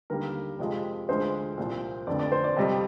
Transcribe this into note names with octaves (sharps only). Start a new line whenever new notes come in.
D#2 D3 G3 A#3 A#4
F2 C3 F3 G#3
D2 D3 F3 G#3 C5
C2 A#2 F3
F1 F2 D3 D5
D5
C5
D5
F2 C3 G3 D#5